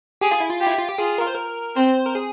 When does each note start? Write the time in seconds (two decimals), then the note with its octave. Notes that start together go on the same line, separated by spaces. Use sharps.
0.21 G4 G#4
0.31 F4
0.40 E4
0.49 F4
0.60 G4
0.67 E4
0.77 F4
0.89 G4
0.98 F4 G#4
1.18 A#4
1.27 C5
1.35 A#4
1.76 C4 C5
2.06 A#4
2.15 G#4